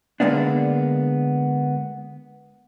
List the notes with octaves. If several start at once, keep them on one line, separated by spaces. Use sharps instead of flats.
D3 E3 G#3 A#3 B3 D4